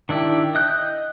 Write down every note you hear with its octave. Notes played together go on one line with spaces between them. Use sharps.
D#3 D4 E4 G4
D#5 F#6 G6